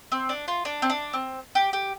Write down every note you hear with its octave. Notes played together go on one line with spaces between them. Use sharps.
C4
D4
F4
D4
C4
D4
C4
G4
G4